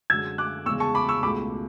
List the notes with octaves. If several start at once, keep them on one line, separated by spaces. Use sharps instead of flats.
F#2 D3 G#3 E6 G#6
D6 F#6
E2 C#3 G#3 C#6 E6
A5 C#6
B5 D6
C#6 E6
C#2 B2 A3 B5 D6